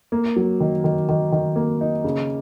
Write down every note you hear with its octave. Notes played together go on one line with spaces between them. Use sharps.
A#3
F#3
D#3
D#3
D#3
D#3
A#3
D#4
C#3